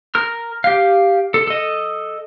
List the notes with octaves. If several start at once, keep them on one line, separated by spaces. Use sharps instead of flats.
A#4 F6
G4 F5
A4
A4 D#5